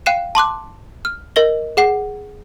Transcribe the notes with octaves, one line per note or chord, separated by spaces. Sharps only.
F5 G5 F#6 C7 D#7 E7
A5 C6 D6 F#6
F6
A#4 D#5 A#6 G7
G#4 F#5 C7